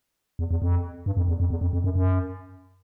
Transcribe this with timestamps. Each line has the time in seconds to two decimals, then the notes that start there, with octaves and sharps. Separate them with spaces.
0.39 E2
0.51 E2
0.62 F2
1.06 G2
1.17 F2
1.28 E2
1.40 F2
1.50 E2
1.61 F2
1.73 F2
1.84 F#2
1.95 F#2